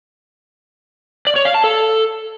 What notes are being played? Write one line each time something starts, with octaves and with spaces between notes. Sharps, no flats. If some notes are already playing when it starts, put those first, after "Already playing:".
D5
C#5
F5
A5
A4